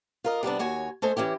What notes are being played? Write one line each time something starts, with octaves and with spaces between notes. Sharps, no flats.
F4 A#4 D#5
C3 G3 B3 D4
D#2 F#4 C#5 G#5
A3 A4 C5 D#5 G#5
E3 C#4 E4 G4